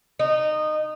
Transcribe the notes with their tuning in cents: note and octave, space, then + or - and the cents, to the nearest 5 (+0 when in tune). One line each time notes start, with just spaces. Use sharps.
D#4 -20